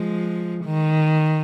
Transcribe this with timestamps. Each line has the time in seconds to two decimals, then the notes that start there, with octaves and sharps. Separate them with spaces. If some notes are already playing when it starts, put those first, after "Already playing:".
Already playing: F3 G#3
0.65 D#3